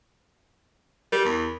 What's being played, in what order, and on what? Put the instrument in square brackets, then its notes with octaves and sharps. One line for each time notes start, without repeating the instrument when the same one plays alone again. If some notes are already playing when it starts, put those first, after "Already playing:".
[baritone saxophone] G3 [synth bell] A#4
[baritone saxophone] E2